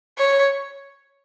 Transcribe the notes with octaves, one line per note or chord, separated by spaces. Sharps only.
C#5